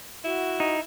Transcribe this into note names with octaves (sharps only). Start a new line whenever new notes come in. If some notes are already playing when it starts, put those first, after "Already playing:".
E4 F#4
D#4